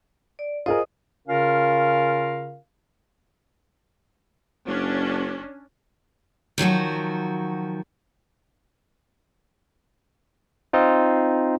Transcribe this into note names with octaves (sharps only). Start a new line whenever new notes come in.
D5
F4 G#4 A#4 C5 D#5 D#6
C#3 C#4 F4 A#4 F5
F#1 C#4 D4
D#3 F3 F#3 F#4
C4 D#4 F4